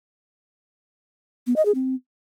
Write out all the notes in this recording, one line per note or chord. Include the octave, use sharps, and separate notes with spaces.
B3
D#5
G#4
C4